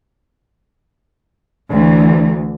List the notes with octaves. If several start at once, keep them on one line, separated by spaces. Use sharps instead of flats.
D2 E3